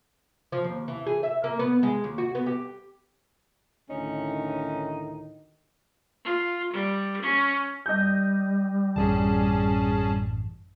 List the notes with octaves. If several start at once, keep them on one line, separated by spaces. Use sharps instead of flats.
F3
D#2
E3
G#4
E5
A#3
B3
G#3
D#2
F#4
B3
G4
D2 A2 D#3 C#4 D#4
F4
G3
C#4
G3 D#5 G6
A1 F#2 E3 C#4 G#4 A5